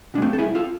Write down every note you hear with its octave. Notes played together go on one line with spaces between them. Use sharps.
B2 G#3 D4
A3 C4
A4
C2 E4 G#4
F4 A4